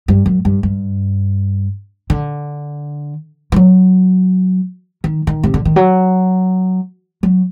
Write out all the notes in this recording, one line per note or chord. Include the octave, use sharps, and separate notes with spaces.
G2
F#2
G2
G2
D3
D#3
F#3
D#3
D#3
C3
D3
D#3
F#3
F#3